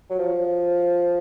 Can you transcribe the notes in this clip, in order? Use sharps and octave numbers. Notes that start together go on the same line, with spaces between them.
F#3
F3